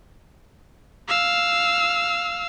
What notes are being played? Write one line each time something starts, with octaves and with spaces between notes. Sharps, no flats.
F5 E6